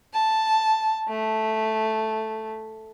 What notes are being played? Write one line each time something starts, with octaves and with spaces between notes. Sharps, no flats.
A5
A3